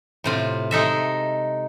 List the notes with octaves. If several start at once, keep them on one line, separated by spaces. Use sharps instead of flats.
A2 C3 F4
G#3 D#4 A4 E5